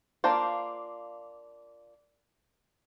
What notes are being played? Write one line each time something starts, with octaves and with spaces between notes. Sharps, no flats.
A#3 D4 F4 C5